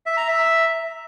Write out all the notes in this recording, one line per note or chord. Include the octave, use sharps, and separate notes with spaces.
E5
A#5
E5